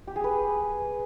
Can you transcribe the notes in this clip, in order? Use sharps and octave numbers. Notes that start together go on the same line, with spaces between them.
G4
G#4
B4